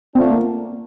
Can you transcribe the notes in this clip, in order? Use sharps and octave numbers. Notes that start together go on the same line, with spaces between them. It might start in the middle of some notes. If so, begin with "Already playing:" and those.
D3 A3 C4 D4 F4
A#3